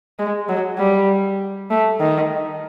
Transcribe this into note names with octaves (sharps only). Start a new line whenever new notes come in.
G#3
F#3
G3
A3
D#3